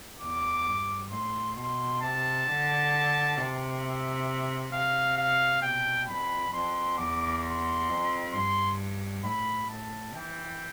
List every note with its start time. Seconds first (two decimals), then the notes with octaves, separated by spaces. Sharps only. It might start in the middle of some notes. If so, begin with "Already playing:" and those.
0.21 E2 D6
0.66 G2
1.11 A2 C6
1.56 B2 C6
2.02 C3 A5
2.47 D3
3.37 C3
3.82 E5
4.73 C3 F5
5.18 F5
5.62 B2 G5
6.08 F2 B5
6.53 F2 C6
6.98 E2 D6
7.43 C6
7.89 F2
8.33 G2 C6
9.24 A2 B5
9.69 A2 A5
10.15 E3 G5